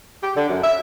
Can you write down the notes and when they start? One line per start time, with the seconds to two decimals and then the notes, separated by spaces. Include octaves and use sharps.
0.23 G4
0.37 D3
0.49 F#2
0.64 E5